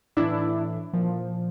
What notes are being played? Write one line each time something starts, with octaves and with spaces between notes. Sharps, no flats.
A2 E3 D4 E4
A#2 F3